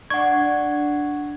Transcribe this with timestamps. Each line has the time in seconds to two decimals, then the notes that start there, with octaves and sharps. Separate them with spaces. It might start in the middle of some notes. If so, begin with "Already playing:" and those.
0.10 D4 F#5 C#6 G#6